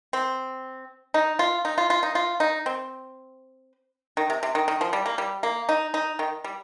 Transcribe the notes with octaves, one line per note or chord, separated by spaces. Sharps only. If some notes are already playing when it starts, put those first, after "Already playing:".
C4
D#4
F4
D#4
F4
F4
D#4
F4
D#4
C4
D#3
C3
C3
D#3
D#3
F3
G3
A#3
G3
A#3
D#4
D#4
D#3
G3